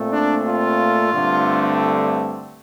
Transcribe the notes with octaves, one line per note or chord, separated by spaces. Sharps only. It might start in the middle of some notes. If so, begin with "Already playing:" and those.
Already playing: A#2 A3 C4
D4
F4
G2 D3 A3 C4